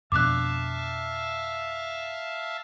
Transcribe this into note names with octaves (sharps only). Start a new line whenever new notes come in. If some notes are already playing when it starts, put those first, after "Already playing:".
F2 B2 D4 E5 F5 A5 D6 F#6